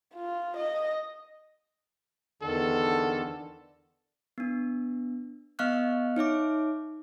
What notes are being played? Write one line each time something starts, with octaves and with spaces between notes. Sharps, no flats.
F4
D#5
E2 D3 D#3 A4
B3 D4
B3 D#5 F5 C#6 F6 F#6
D#4 C#5 E5 D6